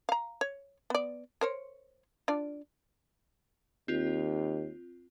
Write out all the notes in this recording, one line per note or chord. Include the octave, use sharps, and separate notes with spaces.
F5 A#5
C#5
B3 D5
A#4 C5 C#5
D4 F4 D5
D#2 C4 F4